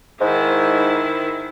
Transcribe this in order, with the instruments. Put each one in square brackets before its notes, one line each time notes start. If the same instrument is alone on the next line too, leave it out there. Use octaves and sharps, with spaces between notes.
[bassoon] G#2 [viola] D#3 E4